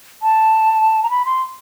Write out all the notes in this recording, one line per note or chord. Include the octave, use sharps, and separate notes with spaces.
A5
A#5
B5
C6